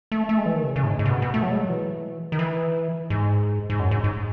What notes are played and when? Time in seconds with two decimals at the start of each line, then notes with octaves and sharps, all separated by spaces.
0.12 A3
0.29 A3
0.38 G#3
0.46 E3
0.55 D#3
0.63 C#3
0.76 C#3
0.83 A2
0.87 G#2
0.99 G#2
1.06 C#3
1.10 B2
1.22 B2
1.34 A3
1.43 F#3
1.51 G#3
1.60 F#3
1.69 E3
2.32 D#3
2.39 E3
3.10 G#2
3.70 G#2
3.80 F#2
3.91 G#2
4.04 G#2